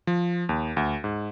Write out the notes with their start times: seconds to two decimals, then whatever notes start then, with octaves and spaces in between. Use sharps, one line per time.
0.07 F3
0.49 D#2
0.77 D2
1.04 G#2